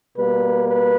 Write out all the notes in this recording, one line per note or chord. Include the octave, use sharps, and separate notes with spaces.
B2 G3 A#3 B4
B4